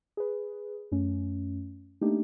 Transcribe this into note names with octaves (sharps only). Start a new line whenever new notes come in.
G#4 B4
F#2 A3 C#4
A3 A#3 D4 D#4 G4